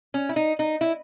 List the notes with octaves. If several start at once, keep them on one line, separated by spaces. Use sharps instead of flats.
C#4
E4
D#4
D#4
E4